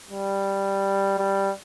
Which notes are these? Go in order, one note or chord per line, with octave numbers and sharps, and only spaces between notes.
G3
G3